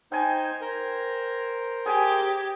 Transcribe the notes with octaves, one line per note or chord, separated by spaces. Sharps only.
D#4 C5 G5 G#5
A#4 C5
G4 G#4 G#5